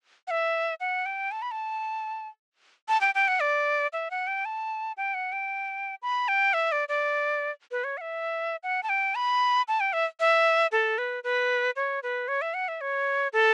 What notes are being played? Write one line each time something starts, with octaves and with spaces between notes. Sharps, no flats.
F#5
E5
F#5
G5
A5
B5
A5
A5
G5
G5
F#5
D5
E5
F#5
G5
A5
G5
F#5
G5
B5
G5
E5
D5
D5
B4
C#5
F#5
E5
F#5
A5
G5
B5
A5
G5
E5
E5
A4
B4
B4
C#5
B4
C#5
E5
F#5
E5
C#5
A4